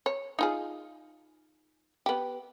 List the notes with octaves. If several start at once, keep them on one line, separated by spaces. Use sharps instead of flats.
C#5
D#4 F4 G#4
B3 G4